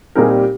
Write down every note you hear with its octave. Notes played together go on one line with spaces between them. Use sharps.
A#2 G3 C4 D#4 G#4 A#4
G4